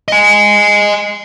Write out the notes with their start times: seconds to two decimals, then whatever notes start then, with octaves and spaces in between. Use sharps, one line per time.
0.08 D#5 G#5